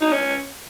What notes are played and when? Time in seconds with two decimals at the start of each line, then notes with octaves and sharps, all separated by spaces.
0.01 D#4
0.12 C#4